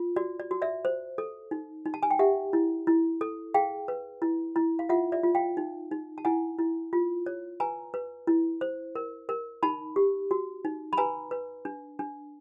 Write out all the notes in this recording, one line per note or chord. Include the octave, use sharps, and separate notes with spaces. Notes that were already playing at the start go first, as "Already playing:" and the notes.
Already playing: F4
F#4 D5
D5
F#4
D5 E5
C5
A4
D#4
D#4
A5
G#5
G5
G4 E5 F#5
E4
E4
A4
G#4 F5 G5
B4
E4
E4
F5
F4 E5 F#5
D5 E5
F4
F5 G5
D#4
D#4
A5
E4 F#5 G#5
E4
F4
C#5
B4 G#5 A#5
B4
E4
C5
A#4
A#4
D#4 A5 B5
G4
F#4
D#4
B5
B4 G#5 A#5
B4
D4
D4